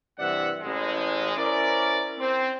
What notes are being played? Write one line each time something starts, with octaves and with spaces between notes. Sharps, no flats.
G2 C3 E3 D5 E5 F#5
A1 G#3
C#4 E4 A#4 C5 D5
C4